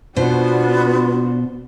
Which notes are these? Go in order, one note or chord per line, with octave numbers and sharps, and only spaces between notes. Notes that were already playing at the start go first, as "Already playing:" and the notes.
B2 B3 D4 F4 F#4 C5